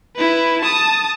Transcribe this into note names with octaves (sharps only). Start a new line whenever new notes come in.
E4 B4
A5 D#6